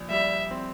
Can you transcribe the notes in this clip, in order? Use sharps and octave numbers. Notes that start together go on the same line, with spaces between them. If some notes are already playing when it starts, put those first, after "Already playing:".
Already playing: A#1
G3 E5
C4